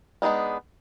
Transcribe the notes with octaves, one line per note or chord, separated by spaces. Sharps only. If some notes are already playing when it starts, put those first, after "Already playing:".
G#3 B3 D4 D#4 F4